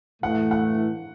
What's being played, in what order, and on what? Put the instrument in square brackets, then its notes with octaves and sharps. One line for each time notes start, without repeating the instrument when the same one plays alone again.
[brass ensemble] A2 E3 A3 [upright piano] F#5
[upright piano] F#5